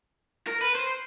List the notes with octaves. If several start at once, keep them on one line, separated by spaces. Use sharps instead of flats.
A#4
B4
C5